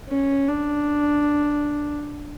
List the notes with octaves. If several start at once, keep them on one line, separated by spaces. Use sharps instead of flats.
C#4
D4